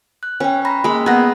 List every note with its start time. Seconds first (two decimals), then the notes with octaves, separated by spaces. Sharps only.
0.23 F#6
0.40 C#4 B4 G5
0.65 A#5 B5 A#6
0.84 G#3 A#3 B5
1.06 B3 G#4 A#5 F#6 A#6